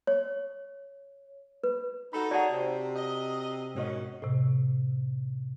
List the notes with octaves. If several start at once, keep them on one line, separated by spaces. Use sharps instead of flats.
C#5
B4
D#4 F#4 A4 B5
A3 F#4 G#4 C#5 D5 F#5 A5 A#5
C3 C4
D#5
G#2 B2 D#3 C#4 F#4 D#5
A2 C3